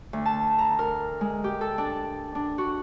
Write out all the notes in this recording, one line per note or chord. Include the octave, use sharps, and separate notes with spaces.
D2
A5
A#5
A#4
G#3
G4
A4
D4
D4
F#4